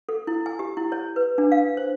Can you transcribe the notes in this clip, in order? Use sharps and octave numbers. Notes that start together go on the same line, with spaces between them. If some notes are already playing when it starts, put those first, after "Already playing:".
A4
E4
G#5
G4
E4
C#5
B4
D4
F5
C5